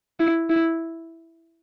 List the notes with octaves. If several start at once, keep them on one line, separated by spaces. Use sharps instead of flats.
E4
E4